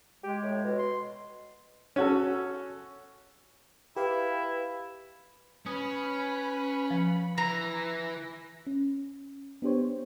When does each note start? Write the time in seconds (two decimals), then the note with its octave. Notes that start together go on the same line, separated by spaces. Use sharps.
0.24 G#3 G4
0.43 A2
0.64 B2
0.78 C6
1.96 C#4 F#4 A4
3.96 E4 G4 B4 F5
5.66 C#4 B4 B5 D#6
6.90 F3
7.38 E3 A#5 A#6
8.67 C#4
9.62 B3 D4 G4 C5 C#5